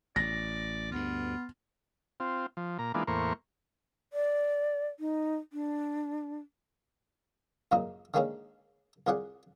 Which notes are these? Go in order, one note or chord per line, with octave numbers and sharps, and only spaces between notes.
A1 D5 A#6
D2 G2 B3 F4
C4 F4
F3
A#2 A#5
E3 G#3 A#3 B3 D4 F4
E2 A2 A#3 A#4 C5 C#6
D5
D#4
D4
C#2 F#2 A#2 A#3 D#5
D3 D#3 G#3 A#3 C#4 D#4
C2 F4 G#4 D5 F#5